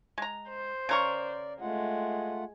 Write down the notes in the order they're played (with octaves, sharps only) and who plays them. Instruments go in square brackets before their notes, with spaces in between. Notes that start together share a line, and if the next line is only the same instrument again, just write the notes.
[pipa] G#3 A#5
[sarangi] C5
[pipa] C#3 A#4 C#6 [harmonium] D5
[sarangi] G#3 [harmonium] A3 F4 F#5